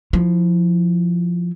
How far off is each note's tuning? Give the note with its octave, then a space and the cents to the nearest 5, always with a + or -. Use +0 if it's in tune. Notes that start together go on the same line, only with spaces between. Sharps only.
F3 +0 E4 +0